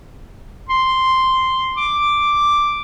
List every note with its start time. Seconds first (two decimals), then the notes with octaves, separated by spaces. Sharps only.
0.69 C6
1.77 D6